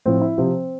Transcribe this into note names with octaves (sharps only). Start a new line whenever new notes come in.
A2 F3 C4
E4
C3 F3 C4